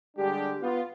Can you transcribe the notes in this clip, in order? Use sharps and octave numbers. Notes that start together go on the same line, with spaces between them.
D3 G3 G#3 D4 G4
B3 F4